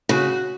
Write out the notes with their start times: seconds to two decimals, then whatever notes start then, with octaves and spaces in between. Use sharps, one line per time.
0.09 C#3 F#4